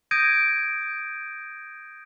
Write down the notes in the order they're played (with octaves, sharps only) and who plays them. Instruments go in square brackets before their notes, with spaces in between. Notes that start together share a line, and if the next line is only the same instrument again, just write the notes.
[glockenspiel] D#6 G6 G#6 A#6 D7 D#7